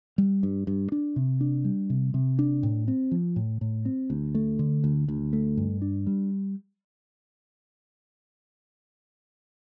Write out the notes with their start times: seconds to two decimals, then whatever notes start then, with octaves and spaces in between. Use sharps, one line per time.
0.18 G3
0.43 G2
0.67 G2
0.92 D4
1.16 C3
1.41 D4
1.65 G3
1.90 C3
2.14 C3
2.39 D4
2.63 A2
2.88 C4
3.11 F3
3.36 A2
3.61 A2
3.85 C4
4.10 D2
4.35 A3
4.59 D3
4.84 D2
5.08 D2
5.33 A3
5.57 G2
5.82 D4
6.07 G3